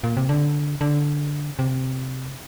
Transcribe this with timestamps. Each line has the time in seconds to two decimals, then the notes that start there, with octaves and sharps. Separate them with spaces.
0.04 A#2
0.17 C3
0.29 D3
0.81 D3
1.59 C3